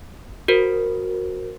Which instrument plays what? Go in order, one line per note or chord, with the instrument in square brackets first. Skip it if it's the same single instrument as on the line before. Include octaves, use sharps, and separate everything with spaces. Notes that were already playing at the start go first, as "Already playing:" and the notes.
[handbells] F#4 A#4 C5